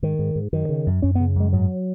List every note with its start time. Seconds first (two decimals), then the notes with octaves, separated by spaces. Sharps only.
0.03 G#2 D#3
0.19 G#2
0.35 G#2
0.53 F#2 D#3
0.69 C#3
0.86 F#2
1.02 F#2 C#4
1.15 B3
1.20 C#3
1.36 F#2 G#3
1.53 G#2 F#3